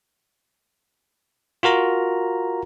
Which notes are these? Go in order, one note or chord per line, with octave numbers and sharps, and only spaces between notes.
F4 F#4 A#4 A#5